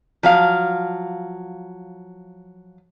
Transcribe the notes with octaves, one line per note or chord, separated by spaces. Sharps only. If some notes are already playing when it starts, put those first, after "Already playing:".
F3 F#3 F5